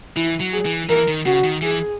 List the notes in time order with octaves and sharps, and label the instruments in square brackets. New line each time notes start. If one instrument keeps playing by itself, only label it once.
[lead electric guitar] E3 [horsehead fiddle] E4
[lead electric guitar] F#3
[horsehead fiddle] G#4
[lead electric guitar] E3
[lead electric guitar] E3 [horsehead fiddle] A#4
[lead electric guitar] D#3
[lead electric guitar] C#3 [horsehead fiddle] F#4
[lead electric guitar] D#3
[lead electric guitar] E3 [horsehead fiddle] G#4